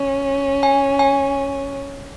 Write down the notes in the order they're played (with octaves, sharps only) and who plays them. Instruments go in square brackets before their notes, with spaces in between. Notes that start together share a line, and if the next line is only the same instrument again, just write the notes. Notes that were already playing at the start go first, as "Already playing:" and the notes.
Already playing: [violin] C#4
[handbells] G#5
G#5